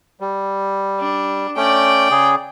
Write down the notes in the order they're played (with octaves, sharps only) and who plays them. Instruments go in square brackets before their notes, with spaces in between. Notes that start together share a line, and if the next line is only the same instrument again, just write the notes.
[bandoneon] G3
[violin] D4
[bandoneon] A3 C#4 [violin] D5 G5
[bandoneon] C#3 G#4